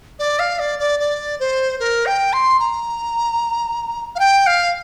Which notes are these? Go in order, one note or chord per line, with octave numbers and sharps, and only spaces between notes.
D5
F5
D5
D5
D5
C5
A#4
G5
C6
A#5
F5
G5
F5